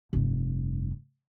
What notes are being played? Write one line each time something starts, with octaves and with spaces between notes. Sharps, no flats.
F1 G2